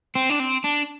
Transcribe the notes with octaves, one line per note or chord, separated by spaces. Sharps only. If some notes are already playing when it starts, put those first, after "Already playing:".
C4
D4
C4
D4